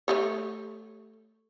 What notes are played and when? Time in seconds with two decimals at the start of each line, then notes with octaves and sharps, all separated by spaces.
0.08 A3 G4 C#5